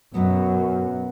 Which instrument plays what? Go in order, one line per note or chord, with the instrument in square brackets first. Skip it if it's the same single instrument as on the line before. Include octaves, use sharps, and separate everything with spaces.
[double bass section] F#2 [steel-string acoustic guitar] B2 F#3 B3